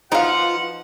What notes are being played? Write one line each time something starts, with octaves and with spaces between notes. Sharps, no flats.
F3 D#4 F4 F#4 B4 F5 F#5